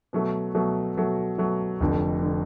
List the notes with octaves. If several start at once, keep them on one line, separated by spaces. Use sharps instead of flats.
B2 F#3 A3
B2 F#3 A3
B2 F#3 A3
B2 F#3 A3
F1 F2 D3
D3